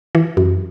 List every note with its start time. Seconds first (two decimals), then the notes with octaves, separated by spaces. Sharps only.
0.15 E3
0.37 F#2